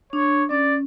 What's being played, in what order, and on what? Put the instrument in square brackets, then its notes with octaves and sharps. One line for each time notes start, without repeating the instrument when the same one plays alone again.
[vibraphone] D4 [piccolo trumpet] C#5
[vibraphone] C#4 [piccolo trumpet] D5